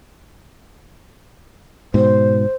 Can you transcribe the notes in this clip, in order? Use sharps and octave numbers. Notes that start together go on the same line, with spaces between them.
G#2 B2 C5